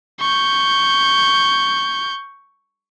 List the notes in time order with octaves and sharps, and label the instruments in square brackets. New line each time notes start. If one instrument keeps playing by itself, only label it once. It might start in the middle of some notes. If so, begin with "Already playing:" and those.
[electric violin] C#6 G6